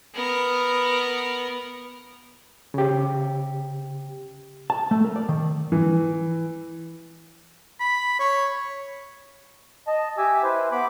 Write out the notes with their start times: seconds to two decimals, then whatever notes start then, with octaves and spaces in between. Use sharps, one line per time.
0.14 B3 A#4
2.74 C#3 G4
4.70 A5
4.91 A3
5.04 A#4
5.16 D5
5.29 D#3
5.72 E3
7.80 B5
8.19 C#5
9.87 D#5 A5
10.18 G4 E5 G#5 D6 E6
10.43 E4 B4 C5
10.72 B3 B5 D6